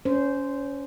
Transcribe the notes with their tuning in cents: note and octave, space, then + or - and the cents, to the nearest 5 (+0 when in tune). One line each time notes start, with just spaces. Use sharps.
C#4 +20 C5 -10